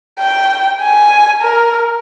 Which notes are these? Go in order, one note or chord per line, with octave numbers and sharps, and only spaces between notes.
G5
G#5
A#4